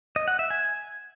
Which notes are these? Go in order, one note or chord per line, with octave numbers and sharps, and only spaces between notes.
D#5
F#5
E5
G#5